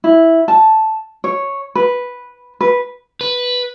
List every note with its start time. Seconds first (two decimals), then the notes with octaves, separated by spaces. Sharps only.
0.04 E4
0.48 A5
1.24 C#5
1.75 B4
2.61 B4
3.21 B4